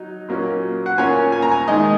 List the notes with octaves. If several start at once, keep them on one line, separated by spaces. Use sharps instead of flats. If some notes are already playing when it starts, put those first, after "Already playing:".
Already playing: F#3 D#4
A#2 F#3 A#3 C#4
F#5
A#2 A#3 C#4 G#5
G#5
A#5
G#5
D#3 G#3 D#4 D#5